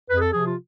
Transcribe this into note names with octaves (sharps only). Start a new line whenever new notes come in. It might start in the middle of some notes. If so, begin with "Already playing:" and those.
F2 B4
G#4
A4
C3 F3 G#4
F4